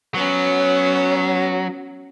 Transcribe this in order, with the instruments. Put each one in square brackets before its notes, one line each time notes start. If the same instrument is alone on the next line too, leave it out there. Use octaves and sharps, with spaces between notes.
[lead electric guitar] F#3 [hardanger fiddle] B3 C#4